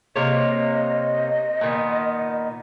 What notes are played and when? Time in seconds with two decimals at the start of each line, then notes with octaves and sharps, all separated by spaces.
0.16 C3 A#3 C#5 D#5
1.61 A#2 D#3 B3